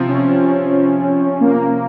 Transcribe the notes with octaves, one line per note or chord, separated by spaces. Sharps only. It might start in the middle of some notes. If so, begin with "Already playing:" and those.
Already playing: C3 F3 C4
C#4
A#3